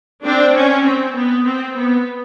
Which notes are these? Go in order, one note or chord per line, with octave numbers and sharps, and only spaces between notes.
C4 D4
C#4
C4
B3
C4
B3